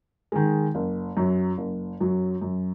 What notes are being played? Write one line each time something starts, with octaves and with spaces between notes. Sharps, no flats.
D#3 G#3
F#1
F#2 F#3
F#1
F#2 F#3
F#2